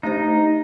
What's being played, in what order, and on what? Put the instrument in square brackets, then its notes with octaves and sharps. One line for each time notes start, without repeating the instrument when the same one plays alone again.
[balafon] A3 D4 G4 C5 [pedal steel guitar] D#4